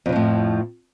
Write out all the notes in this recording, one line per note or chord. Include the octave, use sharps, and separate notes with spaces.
F2 A2 C#3 F3